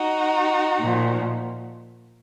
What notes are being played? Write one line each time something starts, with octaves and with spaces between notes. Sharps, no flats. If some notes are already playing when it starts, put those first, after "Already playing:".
Already playing: D#4 F#4
A#2 F3